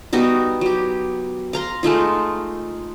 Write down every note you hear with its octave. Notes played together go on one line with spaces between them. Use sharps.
G3 B3 D#4 F#4
F#3 G4
F5 A#5 C6
G#3 A3 D#4 F4